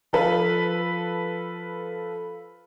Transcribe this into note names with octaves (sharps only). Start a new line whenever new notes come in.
F3 F4 A4 B4